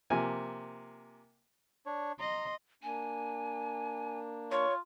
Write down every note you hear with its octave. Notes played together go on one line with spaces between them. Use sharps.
C3 F3 A#3 G#5
D4 C#5
D#5 A#5 C6
A#3 D4 G#5
F4 C#5 C#6